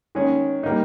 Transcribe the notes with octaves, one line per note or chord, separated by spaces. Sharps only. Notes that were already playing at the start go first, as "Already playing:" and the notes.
D#3 G#3 C#4 G#4
G3 A#3 D#4